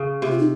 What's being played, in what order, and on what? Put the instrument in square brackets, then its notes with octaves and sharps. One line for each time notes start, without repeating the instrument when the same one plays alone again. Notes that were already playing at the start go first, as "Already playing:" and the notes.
Already playing: [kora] C#3
[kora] C3 [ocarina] G4
[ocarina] F4
D#4